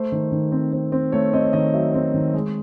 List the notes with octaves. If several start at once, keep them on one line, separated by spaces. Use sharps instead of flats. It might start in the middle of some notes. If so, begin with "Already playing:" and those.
Already playing: A3 C5
D#3
D#3
C4
C4
C4
A3 C#5
C4 D#5
C#5
D#3 D#5
F#3 E5
C4
D#3
G#3